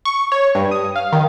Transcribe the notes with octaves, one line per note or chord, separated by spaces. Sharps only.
C#6
C#5
G2
D#6
F5
D#3